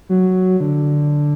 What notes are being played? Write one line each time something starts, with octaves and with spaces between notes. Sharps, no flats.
F#3
D3